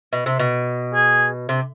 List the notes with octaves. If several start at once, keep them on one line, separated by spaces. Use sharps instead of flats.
B2
C3
B2
G#4
C3